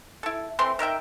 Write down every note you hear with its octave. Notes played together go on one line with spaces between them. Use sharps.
E4 A4
E3 A3 C4 C6
D#3 A#4 E5 G5